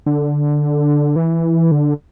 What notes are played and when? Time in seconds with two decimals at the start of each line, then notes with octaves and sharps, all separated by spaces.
0.06 D3
1.16 E3
1.71 D3